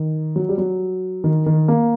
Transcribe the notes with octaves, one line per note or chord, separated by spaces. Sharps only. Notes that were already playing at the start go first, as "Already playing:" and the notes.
Already playing: D#3
F#3
G3
F#3
D#3
D#3
A#3